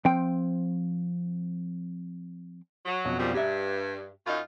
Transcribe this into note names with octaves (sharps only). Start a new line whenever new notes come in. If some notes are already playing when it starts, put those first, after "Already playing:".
F3 C4 G5
F#3
F2 B2 C#4
A#2 F3 G3
G2 G4 E5
F#2 D#4 F4